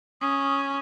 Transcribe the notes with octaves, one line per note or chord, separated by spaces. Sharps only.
C#4 D#6